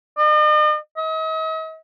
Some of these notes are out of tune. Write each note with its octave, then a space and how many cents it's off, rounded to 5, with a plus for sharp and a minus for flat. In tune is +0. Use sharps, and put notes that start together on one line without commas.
D#5 -45
D#5 +45